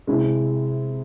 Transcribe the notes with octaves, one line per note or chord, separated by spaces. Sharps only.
C3 G#3 C4 E4